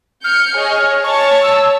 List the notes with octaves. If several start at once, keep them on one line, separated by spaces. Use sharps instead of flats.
F6 G6 C#7
G#4 C#5 D#5
C#5 A5 C#6
E6